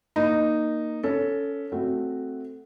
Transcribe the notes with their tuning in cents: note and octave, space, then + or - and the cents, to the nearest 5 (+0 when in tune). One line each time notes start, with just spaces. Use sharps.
A#3 +0 D#4 -10
C#4 +15 A4 +5
A3 +0 C4 +0 F#4 +0